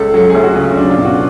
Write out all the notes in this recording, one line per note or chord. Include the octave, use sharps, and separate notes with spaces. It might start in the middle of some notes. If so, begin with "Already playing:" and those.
Already playing: C#2 A4
F#3 A4
D2 G#4
F#4
C#3 F4
F#3 D4
F4
B2
F#4